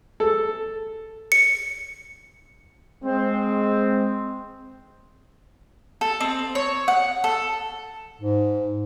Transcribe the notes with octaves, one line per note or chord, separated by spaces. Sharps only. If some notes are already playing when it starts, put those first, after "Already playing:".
A4
C#7
G#3 C4
A4
C4
C#5
F#5
A4
G#2